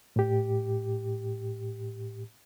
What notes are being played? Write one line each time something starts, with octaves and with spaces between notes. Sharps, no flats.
A2 G4